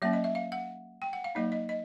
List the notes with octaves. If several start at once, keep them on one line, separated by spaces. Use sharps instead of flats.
F#3 A#3 C#4 E5
D#5
E5
F5
F#5
G5
F#5
F5
F#3 A#3 D#4 D#5
D#5
D#5